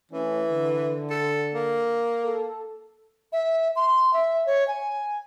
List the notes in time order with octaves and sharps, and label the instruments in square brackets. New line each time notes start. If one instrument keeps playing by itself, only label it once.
[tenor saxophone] E3 [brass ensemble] A3 C#4
[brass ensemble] D3
[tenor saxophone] A4
A#3
[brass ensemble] A4
[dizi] E5
C6
E5
C#5
G#5